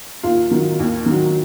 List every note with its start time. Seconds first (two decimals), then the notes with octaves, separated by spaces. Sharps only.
0.23 D#2 F4
0.51 D#3 F#3
0.79 D#2
1.06 D#3 F#3